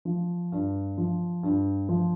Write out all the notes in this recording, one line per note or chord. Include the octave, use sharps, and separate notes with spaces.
F3
G2
F3
G2
F3